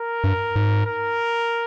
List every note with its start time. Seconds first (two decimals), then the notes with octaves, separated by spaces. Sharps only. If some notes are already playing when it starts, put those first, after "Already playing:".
Already playing: A#4
0.24 G2
0.56 G#2
0.86 A#4